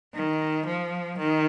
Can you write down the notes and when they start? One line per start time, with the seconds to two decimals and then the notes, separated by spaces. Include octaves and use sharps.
0.14 D#3
0.66 F3
1.18 D#3